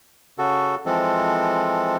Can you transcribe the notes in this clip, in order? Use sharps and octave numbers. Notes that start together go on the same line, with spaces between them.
C#3 F#4 A4
E3 F3 G#3 C4 A4